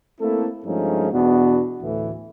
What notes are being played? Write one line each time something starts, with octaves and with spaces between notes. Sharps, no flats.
A3 A#3 C4 E4 A4
G2 F3 G#3 A3 C#4 D#4
E2 B2 B3 D4 F#4
D2 A2 E3